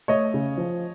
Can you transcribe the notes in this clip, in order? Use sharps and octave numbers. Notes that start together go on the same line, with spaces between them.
A3 C#5 D#5
C#3
F3